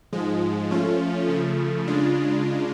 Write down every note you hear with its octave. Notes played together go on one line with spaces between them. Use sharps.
G#2 F3 G#3
F3 A3 C#4 F4
C#3 F3 A3
C#3 G#3 D4 F4